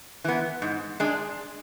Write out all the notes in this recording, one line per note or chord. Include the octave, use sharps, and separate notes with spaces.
E3 B3
G#2
G#3 D4 G#4